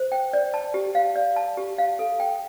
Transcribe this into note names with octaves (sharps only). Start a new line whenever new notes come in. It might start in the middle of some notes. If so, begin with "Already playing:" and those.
Already playing: C5
G5
D5
A5
G4
F5
D5
A5
G4
F5
A4
G5